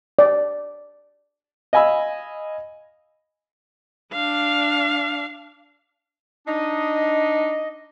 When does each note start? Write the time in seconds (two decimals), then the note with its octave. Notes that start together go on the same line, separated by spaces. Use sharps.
0.19 D5
1.73 D#5 F5 G#5 B5 E6
4.13 D4 F5
6.47 D4 D#4 D#5